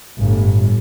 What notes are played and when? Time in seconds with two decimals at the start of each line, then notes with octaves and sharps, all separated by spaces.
0.19 G1 A2